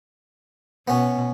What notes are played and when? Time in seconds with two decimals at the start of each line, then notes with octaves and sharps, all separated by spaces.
0.88 B2 B3 C#4